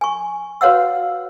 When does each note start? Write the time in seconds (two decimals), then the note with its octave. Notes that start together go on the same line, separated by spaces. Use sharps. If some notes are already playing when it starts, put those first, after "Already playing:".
0.01 G#5 C#6
0.61 F#4 B4 C#5 F5 F#5 E6